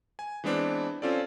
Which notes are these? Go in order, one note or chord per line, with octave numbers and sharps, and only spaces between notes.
G#5
E3 G#3 B3 C4 D4
C4 C#4 F4 A4 D5